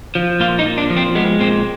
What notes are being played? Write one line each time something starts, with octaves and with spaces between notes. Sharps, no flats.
F3
A#2 F4
D#4
A#2
D4
F3
C4
G#3 B3
A#2 C4